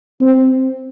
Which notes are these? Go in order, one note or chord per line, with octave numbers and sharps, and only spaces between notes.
C4